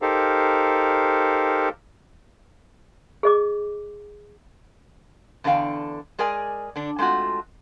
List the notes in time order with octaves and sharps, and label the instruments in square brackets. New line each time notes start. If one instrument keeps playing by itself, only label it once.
[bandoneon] D#4 G4 A4 A#4 C5 F5
[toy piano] G#4 D#5 D6
[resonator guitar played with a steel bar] E2 D3 D4 A4 F5 G5
G#3 G#4 A#4 D5 G#5
D3 D4
G#3 A3 C4 F4 F#4